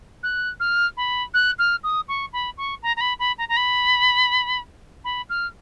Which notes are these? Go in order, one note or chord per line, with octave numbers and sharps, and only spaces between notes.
F#6
F6
B5
F#6
F6
D#6
C#6
B5
C#6
A#5
A#5
B5
B5
A#5
A#5
B5
B5
F6